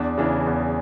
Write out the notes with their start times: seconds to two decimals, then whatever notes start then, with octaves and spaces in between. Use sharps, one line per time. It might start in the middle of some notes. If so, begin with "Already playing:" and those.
Already playing: E2 D4
0.18 C#3 E3 D4
0.47 E2